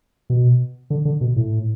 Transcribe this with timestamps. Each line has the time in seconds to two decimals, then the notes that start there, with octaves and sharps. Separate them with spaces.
0.30 B2
0.90 D3
1.05 D3
1.21 B2
1.36 A2